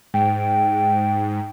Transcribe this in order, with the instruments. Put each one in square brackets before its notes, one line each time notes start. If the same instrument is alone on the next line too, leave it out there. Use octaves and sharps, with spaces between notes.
[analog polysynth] G#2 [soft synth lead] G5